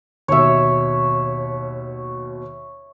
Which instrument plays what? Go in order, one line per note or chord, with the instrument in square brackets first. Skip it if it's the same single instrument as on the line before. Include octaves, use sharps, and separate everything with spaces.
[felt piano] D#2 B2 [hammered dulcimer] C#5 E5